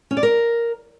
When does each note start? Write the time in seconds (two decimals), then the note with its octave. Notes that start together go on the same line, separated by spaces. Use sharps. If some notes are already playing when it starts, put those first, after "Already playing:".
0.11 C#4
0.17 D5
0.23 A#4